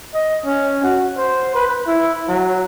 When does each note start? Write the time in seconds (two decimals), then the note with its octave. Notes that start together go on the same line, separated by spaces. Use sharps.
0.14 D#5
0.45 C#4
0.83 F#4
1.17 C5
1.55 B4
1.87 E4
2.28 F#3